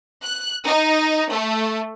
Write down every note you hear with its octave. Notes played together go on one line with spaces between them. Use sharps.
F#6
D#4
A3